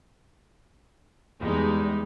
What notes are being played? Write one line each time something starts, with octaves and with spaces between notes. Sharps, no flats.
E2 G3 G#3 D#4